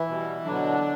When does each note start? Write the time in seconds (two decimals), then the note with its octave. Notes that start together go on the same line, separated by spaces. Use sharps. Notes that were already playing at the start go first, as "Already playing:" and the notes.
Already playing: E3 E4
0.08 B2 G3
0.45 B2 D3 F#3 D4